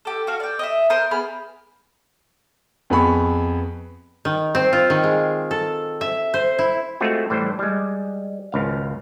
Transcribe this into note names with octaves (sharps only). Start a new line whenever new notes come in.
G4 A4
F#4 A4 F5
D5 G5
D#5 E5
A#4 C5 D#5 C6
B3 G#4 B5 F6
F2 B3 G#4 B5 C#6
D#3
C4
F4
D#3
G#3
A4
E5
C5
E4
G#3 A3 C4 F4 F#4
A2 E3 G3 C5
G3 G#3
G#1 C#2 F5